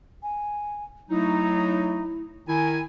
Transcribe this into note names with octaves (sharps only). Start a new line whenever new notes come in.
G#5
F#3 A3 D#4 E4
D#3 E4 G#5